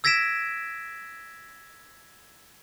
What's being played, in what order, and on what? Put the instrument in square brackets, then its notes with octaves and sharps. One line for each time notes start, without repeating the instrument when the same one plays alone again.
[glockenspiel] E6 G#6 A#6 B6 D7 E7